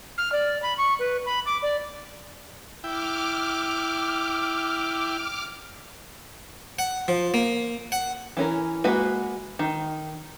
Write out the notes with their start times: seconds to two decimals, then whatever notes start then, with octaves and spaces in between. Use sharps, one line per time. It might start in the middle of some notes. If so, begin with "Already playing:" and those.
0.17 F6
0.32 D5
0.62 B5
0.77 C#6
0.99 B4
1.25 B5
1.45 D6
1.62 D5
2.84 E4 G5 D6 F6
6.79 F#5
7.08 F3
7.34 A#3
7.92 F#5
8.37 E3 C#4 A#4
8.84 G#3 A#3 F#4 B4
9.59 D#3